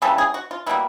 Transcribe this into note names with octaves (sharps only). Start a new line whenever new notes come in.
C#3 E3 G3 A4
G#4
F#4
F4
B2 G3 A#3 E4